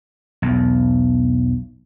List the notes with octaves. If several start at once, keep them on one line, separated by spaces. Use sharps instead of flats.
B1 E2